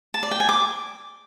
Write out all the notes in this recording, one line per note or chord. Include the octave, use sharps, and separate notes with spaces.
A5
D5
G5
G#5
D6